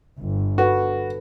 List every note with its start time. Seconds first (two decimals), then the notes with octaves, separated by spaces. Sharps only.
0.19 G1
0.58 F#4 A4 B4